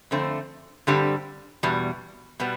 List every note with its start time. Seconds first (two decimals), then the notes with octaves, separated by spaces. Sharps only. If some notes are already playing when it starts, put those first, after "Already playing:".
0.11 F2 D3 A3 C4
0.87 G2 D3 G3 C4 G4
1.63 E2 B2 G3
2.40 B2 G3 B3